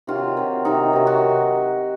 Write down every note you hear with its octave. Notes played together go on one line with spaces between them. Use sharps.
C3 D#3 F#3 F4
C3 D#3 F#3
C3 D#3 F#3 D#4
C3 D#3 F#3
F#4